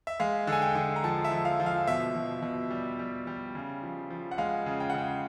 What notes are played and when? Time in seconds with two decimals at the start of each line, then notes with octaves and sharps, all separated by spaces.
0.07 E5
0.20 G#3 F5
0.47 D3
0.52 G#5
0.62 G5
0.75 D3
0.96 A#5
1.04 F3 A5
1.25 E5
1.31 F3
1.45 F5
1.60 F3
1.66 F5
1.87 B2 E5
2.15 B2
2.42 B2
2.70 G3
2.99 G3
3.27 G3
3.55 C#3
3.83 F3
4.10 F3
4.31 F#5
4.38 G#3 F5
4.66 C#3
4.80 G5
4.90 F#5
4.94 C#3 G5